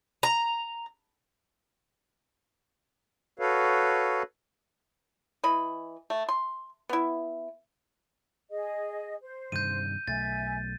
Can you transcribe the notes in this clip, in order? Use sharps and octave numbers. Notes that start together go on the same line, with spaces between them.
A#5
F#4 A4 B4 C#5 F5
E3 D#5 B5
A3
C6
B3 E4
G#4 D#5
C5
G2 C3 D#3 G6 D#7
B1 A3 E5 G#5 A6